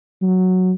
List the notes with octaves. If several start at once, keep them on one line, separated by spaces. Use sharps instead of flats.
F#3